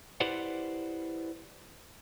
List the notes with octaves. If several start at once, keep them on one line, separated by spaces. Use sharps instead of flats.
E4 G4 B4 C5 D5 F#5